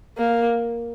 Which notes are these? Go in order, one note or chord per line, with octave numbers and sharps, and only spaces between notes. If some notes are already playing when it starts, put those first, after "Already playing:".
A#3